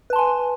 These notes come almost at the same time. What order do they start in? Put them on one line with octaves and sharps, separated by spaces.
B4 A5 C6 G#5